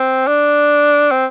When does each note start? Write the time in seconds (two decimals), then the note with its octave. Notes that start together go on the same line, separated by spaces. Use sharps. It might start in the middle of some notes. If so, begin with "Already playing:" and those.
Already playing: C4
0.27 D4
1.11 C4